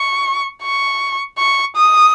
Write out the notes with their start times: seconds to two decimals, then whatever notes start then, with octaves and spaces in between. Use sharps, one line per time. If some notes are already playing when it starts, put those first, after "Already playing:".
Already playing: C#6
0.63 C#6
1.38 C#6
1.76 D#6